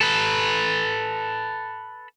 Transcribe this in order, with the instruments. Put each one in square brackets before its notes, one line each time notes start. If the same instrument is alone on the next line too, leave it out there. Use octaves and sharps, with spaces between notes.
[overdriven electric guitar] A4 B4